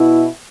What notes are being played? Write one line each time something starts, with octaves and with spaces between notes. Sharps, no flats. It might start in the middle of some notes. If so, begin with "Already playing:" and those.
Already playing: B2 B3 E4